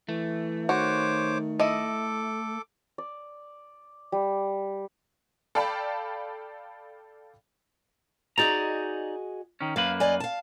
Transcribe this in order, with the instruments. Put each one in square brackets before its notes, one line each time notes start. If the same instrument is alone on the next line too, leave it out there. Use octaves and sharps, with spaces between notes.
[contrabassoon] E3 [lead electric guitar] A3
[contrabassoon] D#3 [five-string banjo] F#4 [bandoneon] C5 C#5 D6
[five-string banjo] E4 D#5 [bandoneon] A4 D6
[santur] D5
G3
[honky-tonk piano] A4 D5 F5 G5 A5 B5
[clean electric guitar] D#4 D5 A#5 [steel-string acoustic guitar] F#4 G#4 D#5
[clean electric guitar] D#3 C#4
[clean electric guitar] F#2 A#3 B4 [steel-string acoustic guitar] F5
[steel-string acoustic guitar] D5 D#5 G#5
F5 A5